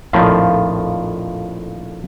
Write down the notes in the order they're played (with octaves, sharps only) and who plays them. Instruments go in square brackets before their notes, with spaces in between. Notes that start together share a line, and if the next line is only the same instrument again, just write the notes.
[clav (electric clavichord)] A#1 F2 A2 D#3 F3